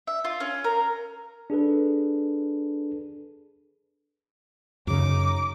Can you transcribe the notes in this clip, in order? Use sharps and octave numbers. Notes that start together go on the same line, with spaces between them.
E5
F4
C#4
A#4
D4 G#4 A4 B4
F#2 C#3 D#4 D6